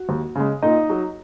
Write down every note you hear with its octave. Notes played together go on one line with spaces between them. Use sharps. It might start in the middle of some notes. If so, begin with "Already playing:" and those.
Already playing: F#4
D#2
C#3 G#3
A#2 D#4 D#5
F#3